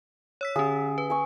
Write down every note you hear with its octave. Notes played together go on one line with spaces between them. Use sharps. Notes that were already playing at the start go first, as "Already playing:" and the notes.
C#5 E6 B6
D3 C#4 G#4
B4
G#5 C#6